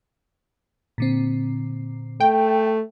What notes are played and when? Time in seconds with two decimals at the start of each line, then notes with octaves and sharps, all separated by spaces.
0.98 A#2 D3 C4
2.20 A3 G5